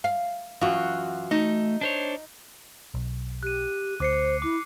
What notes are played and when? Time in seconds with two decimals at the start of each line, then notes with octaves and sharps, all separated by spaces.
0.04 F5
0.61 F#2 E3 F4 F#4
1.31 A3 D#4
1.81 D4 C5 C#5
2.94 B1
3.43 G4 F#6 D#7
4.00 D2 C5 D6 C7 C#7
4.42 E4 D6